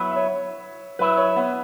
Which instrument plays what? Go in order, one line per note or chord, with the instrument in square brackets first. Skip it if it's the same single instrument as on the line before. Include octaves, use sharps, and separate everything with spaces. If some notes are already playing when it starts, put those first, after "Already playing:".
Already playing: [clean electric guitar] F#3 B3 E4 [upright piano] E5
[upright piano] E5
C#5
[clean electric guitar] F#3 E4 [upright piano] B4
[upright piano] C#5
B3